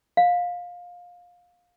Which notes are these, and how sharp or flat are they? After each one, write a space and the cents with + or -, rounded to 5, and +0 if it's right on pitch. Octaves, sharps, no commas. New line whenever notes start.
F5 +20